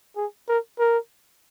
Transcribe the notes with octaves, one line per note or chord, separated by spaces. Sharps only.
G#4
A#4
A#4